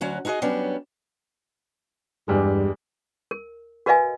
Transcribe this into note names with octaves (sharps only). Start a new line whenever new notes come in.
D2 F#3 C#4 F#4
D#4 E4 F#4 G#4 D#5
F#3 G3 B3 C#4 D4
E2 G2 G3 G#3
A#4
F#4 A#4 B4 D#5 F5 G#5